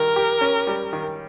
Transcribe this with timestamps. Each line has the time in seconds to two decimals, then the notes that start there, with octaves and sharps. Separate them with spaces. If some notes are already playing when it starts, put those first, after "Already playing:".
Already playing: D#3 G3 A#4
0.16 G4
0.41 C#4
0.67 G3
0.93 D#3